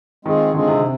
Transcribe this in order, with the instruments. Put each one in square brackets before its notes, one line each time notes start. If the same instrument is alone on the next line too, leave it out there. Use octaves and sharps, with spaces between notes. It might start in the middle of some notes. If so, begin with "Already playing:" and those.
[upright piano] D#3 [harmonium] G#3 C4 F4 G#4
[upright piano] D3 [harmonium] G#3 C4 F4 G#4
[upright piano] C3
[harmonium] C3